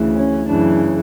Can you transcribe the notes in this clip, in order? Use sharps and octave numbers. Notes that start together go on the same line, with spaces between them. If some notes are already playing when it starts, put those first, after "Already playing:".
Already playing: D2 C#3 E3
C#4
F#2 C#3 E3 D4